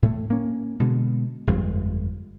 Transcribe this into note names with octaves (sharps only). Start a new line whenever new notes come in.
A2 A3
A#3 C#4
B2 D3 G#3
G1 F2 G#3